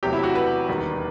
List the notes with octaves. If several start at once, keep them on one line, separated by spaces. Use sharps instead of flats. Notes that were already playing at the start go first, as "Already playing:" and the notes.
E2 C3 F#3 A3 G4
E4
F#4
B4
E1 D#2 D#3 G3